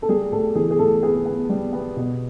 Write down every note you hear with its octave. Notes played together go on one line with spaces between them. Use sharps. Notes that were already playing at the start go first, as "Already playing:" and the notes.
A4
G3 G#4
A2 A4
E3 G#4
G#4
A2 A4
B3 G#4
B3
G3
B3
B2